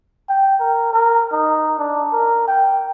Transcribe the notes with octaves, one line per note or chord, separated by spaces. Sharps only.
G5
A#4
A#4
D#4
D4
A#4
G5